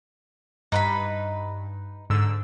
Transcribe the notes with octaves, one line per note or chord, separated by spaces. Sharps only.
G2 D#4 B4 B5
G#2 D3 E6